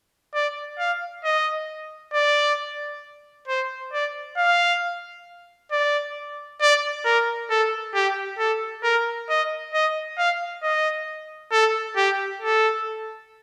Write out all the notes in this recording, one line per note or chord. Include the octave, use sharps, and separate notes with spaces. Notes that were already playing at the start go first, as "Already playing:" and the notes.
D5
F5
D#5
D5
C5
D5
F5
D5
D5
A#4
A4
G4
A4
A#4
D#5
D#5
F5
D#5
A4
G4
A4